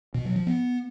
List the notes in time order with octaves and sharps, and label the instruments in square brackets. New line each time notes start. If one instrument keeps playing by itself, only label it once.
[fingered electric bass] B2
F#3
F3
B3